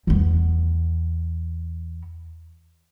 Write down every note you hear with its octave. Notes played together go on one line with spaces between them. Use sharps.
E2 B3